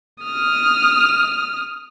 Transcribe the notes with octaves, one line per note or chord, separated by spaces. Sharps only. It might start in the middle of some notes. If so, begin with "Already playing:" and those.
D#6 F6